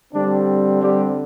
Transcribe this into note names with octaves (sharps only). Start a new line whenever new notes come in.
D3 G3 C4 D4
G3 G4